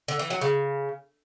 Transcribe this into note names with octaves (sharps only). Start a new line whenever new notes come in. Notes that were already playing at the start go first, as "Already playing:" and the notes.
D3
E3
F#3
C#3